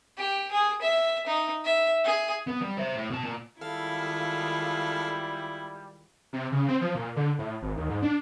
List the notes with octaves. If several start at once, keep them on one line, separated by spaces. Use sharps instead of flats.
G4
G#4
E5
D#4
E5
G#4
B3 B4
G3
C5 E5
A2
B2 A5
A#2
D#3 G3 G#3 E4 F4 A4 F5
C3
C#3
C4
F3
A#2
D3
A2
G#1
D#2
G#2
D4